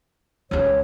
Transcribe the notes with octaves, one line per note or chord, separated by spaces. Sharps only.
C#2 C#3 C#5